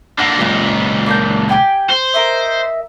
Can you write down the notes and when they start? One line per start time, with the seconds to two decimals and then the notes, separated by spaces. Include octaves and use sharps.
0.19 D3 A#3 F#5 F#6
0.39 C#2 A#2 G4 D#5
1.06 A#3 D4 G6
1.49 G4 G5 G#5
1.90 C5
2.14 A#4 D#5 E5